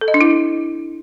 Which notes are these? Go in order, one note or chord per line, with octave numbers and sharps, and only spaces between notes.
A4
D#5
D4
E4